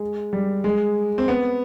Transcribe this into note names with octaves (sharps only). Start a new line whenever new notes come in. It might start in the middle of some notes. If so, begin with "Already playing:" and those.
Already playing: G#3
G3
G#3
C4
B3